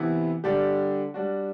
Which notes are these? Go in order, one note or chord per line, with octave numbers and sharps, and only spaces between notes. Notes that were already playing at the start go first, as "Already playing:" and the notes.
Already playing: C3 E3 B3 E4
D3 G3 D4 G4
G3 D4 F#4